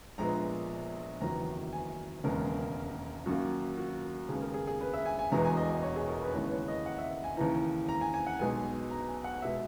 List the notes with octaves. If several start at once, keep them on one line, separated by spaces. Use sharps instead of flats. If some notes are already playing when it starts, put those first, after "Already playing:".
A#1 A#2 G#3 B3 A#5
F#1 E2 D#3 F#3 B3 A#5
G#5
E1 D#2 C#3 G#3 B3 A#4
F#2 D#3 A#3 F#4
F#4
D#2 C#3 G#3 B3 G#4
A#4
G#4
G#4
B4
E5
G#5
G#5
E1 E2 B2 G#3 B3 A#5
G#5
D#5
D#5
C#5
G#4
A#4
B4
D#2 C#3 E3 G#3 B3 C#5
B4
C#5
D#5
F#5
E5
G#5
D#2 C#3 E3 A#5
A#5
G#5
G#5
F#5
B1 B2 G#3 B3 G#5
A#5
G#5
F#5
B2 G#3 E5